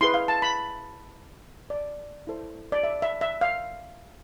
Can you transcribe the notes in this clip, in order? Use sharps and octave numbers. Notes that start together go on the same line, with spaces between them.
E4 G#4 B4 C6
F5
A5
B5
D5
E4 A4 C5
D5
E5
E5
E5
F5